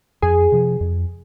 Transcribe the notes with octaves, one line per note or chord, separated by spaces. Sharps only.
F2 G#4
C3 F3
F2